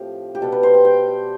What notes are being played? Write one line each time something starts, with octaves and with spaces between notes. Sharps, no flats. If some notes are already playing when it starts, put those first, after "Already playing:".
Already playing: A2 F3 C4 G4
G4
B2 G3 B3 A4
B4
C5
G5
G5